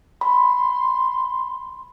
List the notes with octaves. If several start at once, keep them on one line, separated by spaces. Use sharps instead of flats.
B5 C6